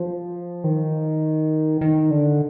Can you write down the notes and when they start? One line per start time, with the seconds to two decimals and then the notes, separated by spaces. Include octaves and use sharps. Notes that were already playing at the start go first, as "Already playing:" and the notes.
Already playing: F3
0.64 D#3
1.81 D#3
2.11 D3